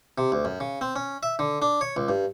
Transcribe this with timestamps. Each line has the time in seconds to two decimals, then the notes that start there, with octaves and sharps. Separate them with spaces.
0.18 C3
0.32 D2
0.45 F#2
0.60 C#3
0.81 C4
0.96 C#4
1.23 E5
1.39 D3
1.62 D4
1.81 C#5
1.97 C#2
2.09 G2